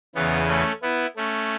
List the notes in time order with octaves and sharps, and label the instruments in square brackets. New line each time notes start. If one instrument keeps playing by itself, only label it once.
[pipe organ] E2 C#3 E3 B3
A3 C#4
B3 E4
A3 C#4